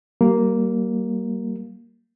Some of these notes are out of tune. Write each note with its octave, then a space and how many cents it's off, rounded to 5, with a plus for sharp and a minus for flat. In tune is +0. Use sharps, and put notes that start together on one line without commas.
G3 -35 A#3 +0